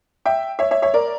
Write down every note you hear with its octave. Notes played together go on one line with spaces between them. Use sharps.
E5 G5
C#5 E5
C#5 E5
C#5 E5
A#4 D5